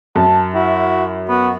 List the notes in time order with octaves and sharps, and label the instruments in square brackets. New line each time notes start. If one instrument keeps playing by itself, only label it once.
[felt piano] F#2 [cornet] A5
[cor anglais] E4 [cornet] F#4
[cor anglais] B3 [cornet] F#4